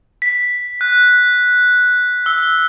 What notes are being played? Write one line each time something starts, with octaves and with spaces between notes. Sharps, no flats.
B6
F#6
E6